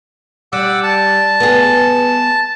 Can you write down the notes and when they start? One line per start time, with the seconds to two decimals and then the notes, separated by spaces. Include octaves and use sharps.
0.53 G3 F#5 D6 E6
0.83 A5
1.40 B3 G#4